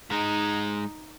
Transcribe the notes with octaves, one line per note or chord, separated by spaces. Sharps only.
G#2 G#3 D#4